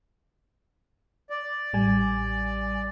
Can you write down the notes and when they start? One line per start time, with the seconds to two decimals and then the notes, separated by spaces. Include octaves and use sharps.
1.30 D5
1.73 A1 G3 G#5